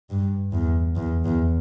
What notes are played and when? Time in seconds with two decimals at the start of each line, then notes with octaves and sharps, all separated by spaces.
0.10 G2
0.52 E2
0.96 E2
1.25 E2